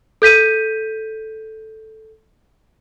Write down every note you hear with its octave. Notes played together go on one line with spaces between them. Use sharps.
A4 G6 B6 D#7